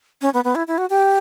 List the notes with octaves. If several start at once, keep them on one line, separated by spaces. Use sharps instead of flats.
C#4
B3
B3
E4
E4
F#4
G4